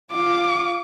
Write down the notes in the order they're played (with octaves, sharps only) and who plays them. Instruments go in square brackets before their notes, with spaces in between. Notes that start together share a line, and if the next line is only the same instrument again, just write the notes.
[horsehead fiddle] F4 F5 [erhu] D6